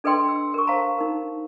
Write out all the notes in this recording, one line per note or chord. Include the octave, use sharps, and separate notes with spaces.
D4 A4 B4 D#5 G5 C6
E6
A#4 C#6
C5 F5 A5 A#5
D#4 A#4